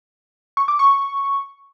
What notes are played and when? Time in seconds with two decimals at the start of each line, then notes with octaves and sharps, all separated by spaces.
0.57 C#6
0.68 D6
0.79 C#6